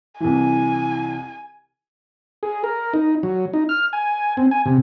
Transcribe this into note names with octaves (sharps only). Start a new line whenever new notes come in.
C2 E3 G#5
G#4
A#4
D#4
F#3
D#4
F6
G#5
C4
G#5
C3